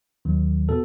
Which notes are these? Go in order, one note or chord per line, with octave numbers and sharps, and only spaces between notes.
D#2 D#3 F#3
B2 A4